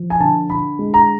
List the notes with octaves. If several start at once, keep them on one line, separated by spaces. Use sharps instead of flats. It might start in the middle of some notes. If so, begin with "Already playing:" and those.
Already playing: F3
G#5
D3 A5
D3 B5
G#3
A#5